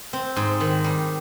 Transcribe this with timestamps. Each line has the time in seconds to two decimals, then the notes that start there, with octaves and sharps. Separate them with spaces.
0.13 C4
0.36 G#2
0.60 D#3
0.84 G3